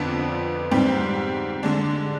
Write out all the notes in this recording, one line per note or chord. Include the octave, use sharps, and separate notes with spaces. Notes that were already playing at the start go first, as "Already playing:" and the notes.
Already playing: F2 D3 F3 B3 D4
G#2 G3 C4 G4
D3 G#3 D4